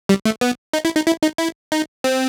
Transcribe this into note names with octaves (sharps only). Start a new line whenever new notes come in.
G3
A3
B3
D#4
E4
D#4
E4
D#4
E4
D#4
C4